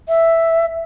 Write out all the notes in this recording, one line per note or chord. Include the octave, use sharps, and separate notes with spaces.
E5